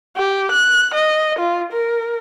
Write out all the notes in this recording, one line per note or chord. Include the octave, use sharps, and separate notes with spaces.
G4
F#6
D#5
F4
A#4